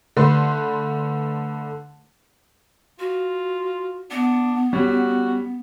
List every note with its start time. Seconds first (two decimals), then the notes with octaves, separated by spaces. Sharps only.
0.17 D3 A3 B4 C6
2.99 F4 F#4
4.11 B3 D4
4.73 G3 C#4 F#4